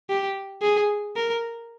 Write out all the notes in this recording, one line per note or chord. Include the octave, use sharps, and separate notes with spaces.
G4
G#4
A#4